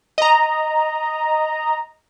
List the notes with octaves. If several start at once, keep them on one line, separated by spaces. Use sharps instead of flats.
D#5 A#5